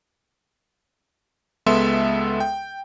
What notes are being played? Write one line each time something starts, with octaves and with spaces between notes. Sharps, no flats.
C#2 G#3 B3 A4 E5 C6
G5